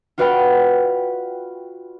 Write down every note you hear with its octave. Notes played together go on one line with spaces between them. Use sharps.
F4 F#4 B4 D5 F5 G5